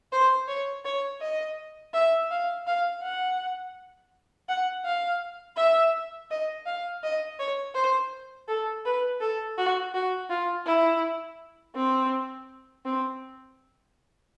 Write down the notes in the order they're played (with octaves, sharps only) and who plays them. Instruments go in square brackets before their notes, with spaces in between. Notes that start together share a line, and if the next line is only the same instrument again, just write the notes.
[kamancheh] C5
C#5
C#5
D#5
E5
F5
F5
F#5
F#5
F5
E5
D#5
F5
D#5
C#5
C5
A4
B4
A4
F#4
F#4
F4
E4
C4
C4